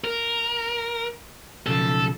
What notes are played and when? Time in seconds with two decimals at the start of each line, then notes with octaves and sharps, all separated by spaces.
0.04 A#4
1.67 B1 C#3 F3 A4